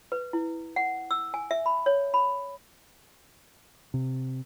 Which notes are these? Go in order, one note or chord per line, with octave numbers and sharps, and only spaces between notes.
B4
E4
F#5
E6
G#5
E5
B5
C#5
B5
C3